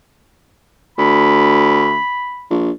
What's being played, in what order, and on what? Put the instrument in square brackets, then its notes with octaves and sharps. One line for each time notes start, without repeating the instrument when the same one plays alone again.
[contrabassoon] D2 [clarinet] B5
[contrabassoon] A#1